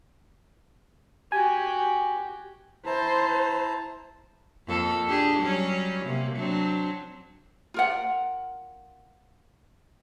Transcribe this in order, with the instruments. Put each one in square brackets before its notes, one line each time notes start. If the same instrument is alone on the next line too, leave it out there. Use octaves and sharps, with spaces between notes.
[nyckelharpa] F#4 G4 [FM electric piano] G#5
[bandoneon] E4 A5 A#5 [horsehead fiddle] C5
[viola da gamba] F2 A#3 A4
D4 G4 G#4
F#3 G3 C#4
C3 A#3
F#3 C4 D4
[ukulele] F4 A#4 F#5